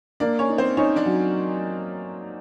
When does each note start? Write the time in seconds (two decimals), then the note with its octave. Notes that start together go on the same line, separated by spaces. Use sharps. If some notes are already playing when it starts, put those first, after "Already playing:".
0.20 A#3 D4 D5
0.39 C#4 C#5
0.49 D#4
0.58 C4 C5
0.77 C#4 D#4 C#5
0.96 D4 D5
1.06 F#3